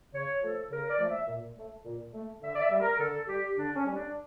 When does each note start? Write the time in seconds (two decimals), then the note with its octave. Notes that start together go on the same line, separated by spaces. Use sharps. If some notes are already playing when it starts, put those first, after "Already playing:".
0.13 C#3 C#5
0.42 F3 A3 A4
0.70 C#3 A#4
0.90 D5
0.99 F3 A3
1.09 E5
1.28 A#2
1.56 A3
1.85 A#2
2.14 A3
2.42 D3 E5
2.55 D5
2.61 E5
2.71 G3
2.80 A#4
2.99 D3 A4
3.28 G3 G4
3.56 D3 D4
3.76 C#4
3.85 G3
3.94 D4